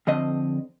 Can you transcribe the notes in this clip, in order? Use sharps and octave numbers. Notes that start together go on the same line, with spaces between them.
F2 D3 C4 D#5